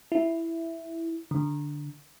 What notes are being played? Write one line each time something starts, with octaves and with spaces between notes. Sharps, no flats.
E4
D3